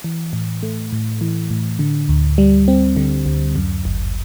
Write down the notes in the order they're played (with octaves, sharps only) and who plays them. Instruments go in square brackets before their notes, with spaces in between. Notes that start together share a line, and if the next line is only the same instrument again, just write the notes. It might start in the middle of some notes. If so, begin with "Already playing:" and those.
[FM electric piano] E3
A2
A3
A2
E3
A2
D3
D2
G3
C4
D3
D2
F#2
G1